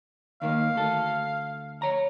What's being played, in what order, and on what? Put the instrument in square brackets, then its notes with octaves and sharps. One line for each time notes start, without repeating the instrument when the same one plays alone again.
[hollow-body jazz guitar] D#2 D#3 A#3 [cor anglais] F5
[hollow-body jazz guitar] D2 A4
C#5 A#5